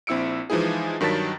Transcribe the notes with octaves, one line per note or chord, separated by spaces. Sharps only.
A#1 C4 E4 E6 C#7 D7
E3 F3 G#3 D#4 E4 G#4
G2 D#3 F#3 A5 A6 B6